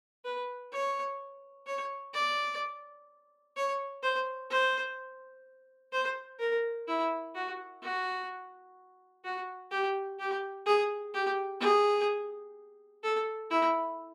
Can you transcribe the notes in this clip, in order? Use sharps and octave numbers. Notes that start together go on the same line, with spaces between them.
B4
C#5
C#5
D5
C#5
C5
C5
C5
A#4
E4
F#4
F#4
F#4
G4
G4
G#4
G4
G#4
A4
E4